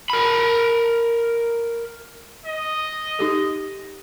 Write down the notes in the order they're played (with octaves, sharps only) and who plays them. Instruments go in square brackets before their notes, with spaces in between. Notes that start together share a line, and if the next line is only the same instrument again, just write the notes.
[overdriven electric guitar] A#4 B5
[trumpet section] D#5
[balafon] D#4 G4 A4